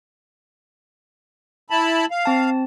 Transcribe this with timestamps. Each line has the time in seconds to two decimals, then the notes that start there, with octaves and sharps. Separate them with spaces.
1.70 E4 A5 B5
2.11 F5
2.25 C4 A5